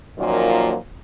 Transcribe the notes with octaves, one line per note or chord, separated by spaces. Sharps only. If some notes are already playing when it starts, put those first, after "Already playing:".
F#2 A#2 D#3 F3 F#3 A#3